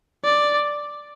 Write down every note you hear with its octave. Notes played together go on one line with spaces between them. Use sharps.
D5